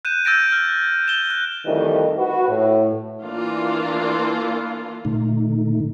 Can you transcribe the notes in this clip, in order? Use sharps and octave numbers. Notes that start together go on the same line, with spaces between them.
F#6 G6 D#7 E7
E6 G6 A6 A#6 D7 E7
F6
E7 G7
F#6
F2 D#3 E3 G3 A3 D#5
F#4 B4
A2
E3 A#3 D4 F4
A#2 D3 A3 D#4